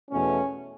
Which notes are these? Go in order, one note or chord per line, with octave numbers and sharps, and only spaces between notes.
E2 B2 A3 C#4